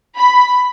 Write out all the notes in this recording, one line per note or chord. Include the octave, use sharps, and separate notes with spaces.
B5